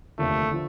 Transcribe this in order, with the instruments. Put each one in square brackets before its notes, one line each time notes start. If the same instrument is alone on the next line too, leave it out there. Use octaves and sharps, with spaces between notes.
[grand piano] F1 D#2 D3 F3 [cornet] A3
[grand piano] D3 F3